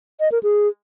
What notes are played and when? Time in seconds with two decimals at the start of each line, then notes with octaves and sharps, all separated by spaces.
0.20 D#5
0.32 A#4
0.43 G#4